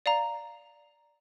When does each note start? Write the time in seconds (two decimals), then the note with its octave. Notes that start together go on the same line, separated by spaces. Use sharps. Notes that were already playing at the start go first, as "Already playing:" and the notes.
0.06 D5 F5 A#5